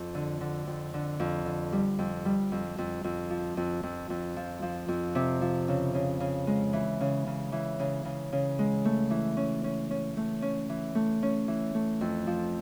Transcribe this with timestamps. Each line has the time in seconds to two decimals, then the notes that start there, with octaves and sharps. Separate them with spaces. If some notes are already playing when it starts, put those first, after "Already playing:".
Already playing: F2
0.15 D3
0.41 D3
0.67 F2
0.94 D3
1.20 F2
1.45 D3
1.72 G3
1.99 F2
2.25 G3
2.52 F2
2.78 F2
3.04 F2
3.30 F3
3.57 F2
3.83 F2
4.10 F2
4.37 F3
4.62 F3
4.88 F2
5.15 C3
5.41 F3
5.68 C#3
5.94 C#3
6.20 C#3
6.47 G#3
6.73 E3
7.01 C#3
7.27 C#3
7.52 E3
7.79 C#3
8.05 C#3
8.32 C#3
8.59 G#3
8.85 A3
9.10 E3
9.37 C#4
9.64 C#4
9.91 C#4
10.17 A3
10.42 C#4
10.69 E3
10.95 A3
11.23 C#4
11.48 E3
11.75 A3
12.01 F2
12.27 F3